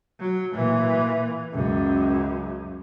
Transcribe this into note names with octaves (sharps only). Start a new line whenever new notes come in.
F#3
A#2 E3
C#2 F#2